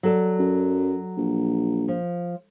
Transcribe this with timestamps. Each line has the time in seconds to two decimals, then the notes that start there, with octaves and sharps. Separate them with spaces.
0.03 F#3 A4 D5
0.39 F#2
1.18 A#1
1.88 F3